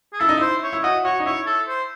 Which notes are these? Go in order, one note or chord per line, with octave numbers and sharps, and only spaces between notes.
G#4
E4 A4
D#4
E4 C5
C#5
E4
F#4 D#5
F#4 C#5
D#4
E4 C#5
A4
C5